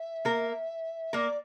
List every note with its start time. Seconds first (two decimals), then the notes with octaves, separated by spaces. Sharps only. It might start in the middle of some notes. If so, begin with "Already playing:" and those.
Already playing: E5
0.25 A#3 A#4
1.13 A#3 A#4 D5